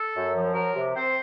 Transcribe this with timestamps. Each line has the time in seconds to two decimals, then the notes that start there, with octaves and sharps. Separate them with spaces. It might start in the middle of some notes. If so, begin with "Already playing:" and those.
Already playing: A4
0.15 F#2
0.34 F3
0.54 F#3 A#4
0.75 C3
0.94 C4 C5